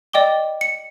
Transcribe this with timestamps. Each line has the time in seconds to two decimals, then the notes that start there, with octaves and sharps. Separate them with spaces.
0.13 D5 D#5 G5 D6 G7
0.61 C#7